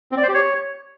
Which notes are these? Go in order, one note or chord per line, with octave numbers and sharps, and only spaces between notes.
C4
D5
C5
G4
C#5